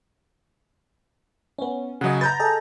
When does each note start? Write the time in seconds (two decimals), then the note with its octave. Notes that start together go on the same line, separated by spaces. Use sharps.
1.58 B3 C#4
2.01 C#3 F#3 D#5 F#5
2.21 B4 A#5 G6 A6
2.40 G#4 A4 D#5